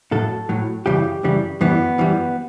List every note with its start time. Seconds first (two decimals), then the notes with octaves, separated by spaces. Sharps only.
0.12 A2 F#3 A4
0.49 A2 F#3
0.86 F#2 C#3 E3 G3 G4
1.23 F#2 C#3 E3 G3
1.61 F#2 E3 G3 B3
1.98 F#2 E3 G3